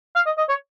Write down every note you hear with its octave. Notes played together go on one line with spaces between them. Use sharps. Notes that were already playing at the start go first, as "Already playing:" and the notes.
F5
D#5
D#5
C#5